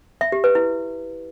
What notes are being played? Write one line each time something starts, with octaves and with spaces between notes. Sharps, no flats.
E5
G4
B4
E4